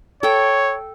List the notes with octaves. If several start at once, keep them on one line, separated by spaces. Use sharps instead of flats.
A4 C#5 G5